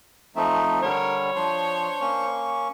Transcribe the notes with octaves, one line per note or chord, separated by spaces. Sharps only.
F3 A3 C4 D#4 E5
D3 G3 A#4 C#5
F3 D4 C5 C6
A#3 C#4 C#6